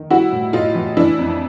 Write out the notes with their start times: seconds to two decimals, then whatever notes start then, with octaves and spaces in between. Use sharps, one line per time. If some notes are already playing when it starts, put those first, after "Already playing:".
Already playing: D#3
0.10 G3 E4 F#4
0.32 A2
0.53 A2 D#4 F4
0.75 E3
0.97 E3 D4 E4
1.19 F2